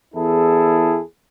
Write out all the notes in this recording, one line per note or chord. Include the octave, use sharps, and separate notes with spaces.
E2 E4 G#4 A4